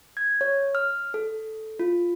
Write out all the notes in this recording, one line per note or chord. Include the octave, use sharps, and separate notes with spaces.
G#6
C#5
F6
A4
F4